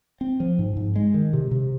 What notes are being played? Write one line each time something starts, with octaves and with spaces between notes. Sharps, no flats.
C4
F3
G#2
G#2
G#3
D#3
C3
C3